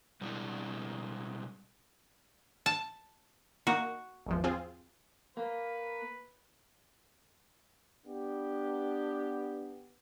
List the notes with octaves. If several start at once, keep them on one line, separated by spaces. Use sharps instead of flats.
B2 G3 G#3 D4 E4
A5
A#3 D#4 F#4
G#1 E2 F3
C4 F4 G#4
A#3 B4
B3 D4 G4